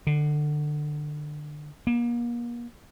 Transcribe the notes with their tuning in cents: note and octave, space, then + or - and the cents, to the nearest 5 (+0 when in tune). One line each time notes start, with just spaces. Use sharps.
D3 +25
A#3 +35